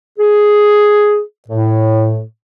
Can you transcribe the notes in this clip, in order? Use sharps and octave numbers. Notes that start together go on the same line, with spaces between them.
G#4
A2